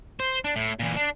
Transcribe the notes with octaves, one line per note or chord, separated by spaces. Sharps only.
C5
D4
A2
A#2 E3
D4